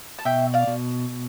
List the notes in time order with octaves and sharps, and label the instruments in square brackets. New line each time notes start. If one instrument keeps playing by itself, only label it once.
[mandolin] A5
[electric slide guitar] B2 [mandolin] E5 G5
[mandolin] D5 F5
[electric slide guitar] B2